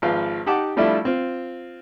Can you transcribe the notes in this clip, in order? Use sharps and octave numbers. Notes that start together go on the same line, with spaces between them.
G#1 F3 B4 F5
D#4 G4 F#5 A5 D6
F3 G3 A3 D4 E4 F4
C4 F4